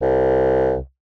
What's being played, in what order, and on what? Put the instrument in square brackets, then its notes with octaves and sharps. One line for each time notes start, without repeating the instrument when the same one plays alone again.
[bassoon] C2